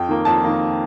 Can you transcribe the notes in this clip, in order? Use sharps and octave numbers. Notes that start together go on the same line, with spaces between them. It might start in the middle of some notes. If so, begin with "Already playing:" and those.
Already playing: F2 G5
D#3 A#3
F2 A5
D#3 A#3